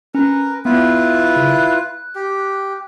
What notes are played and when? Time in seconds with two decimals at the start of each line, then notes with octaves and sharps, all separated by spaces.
0.15 C#4 A#4 B4
0.65 B3 E4 F4 B4
1.36 C#3
1.51 F#6
2.15 G4